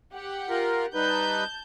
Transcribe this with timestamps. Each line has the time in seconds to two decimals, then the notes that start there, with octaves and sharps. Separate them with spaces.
0.13 G4 F#5
0.49 F4 A#4
0.95 G3 D#4 B4 A5 G6